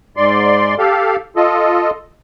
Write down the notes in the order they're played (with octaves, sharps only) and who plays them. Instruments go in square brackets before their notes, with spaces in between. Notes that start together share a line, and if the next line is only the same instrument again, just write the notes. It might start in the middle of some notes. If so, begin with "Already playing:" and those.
[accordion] G#2 D5 C6
G4 A4 F5
F4 A4 D#5